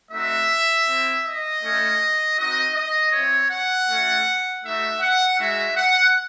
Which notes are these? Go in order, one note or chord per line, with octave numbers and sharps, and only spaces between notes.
A3 C4 D#4 F#4 E5
C4 E4
D#5
A3 C#4 E4
C4 D#4 F#4 D#5
D#5
C4 E4 C#5
F#5
A3 C#4 F#4
A3 D#4 F#4 E5
F#5
G#3 D#4 F#4 E5
F#5